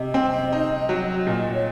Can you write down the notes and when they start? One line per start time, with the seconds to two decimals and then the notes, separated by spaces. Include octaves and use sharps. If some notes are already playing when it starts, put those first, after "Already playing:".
Already playing: C3 D#5
0.14 C4
0.52 D#4
0.89 F#3
1.27 A#2 D#5
1.54 C#5